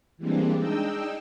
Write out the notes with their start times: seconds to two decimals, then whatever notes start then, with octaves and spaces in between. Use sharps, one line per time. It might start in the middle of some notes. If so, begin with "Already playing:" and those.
0.18 E3 G3 G#3 A#3 C4 D4
0.56 G#3 D4 D#4 D#5 G5 E6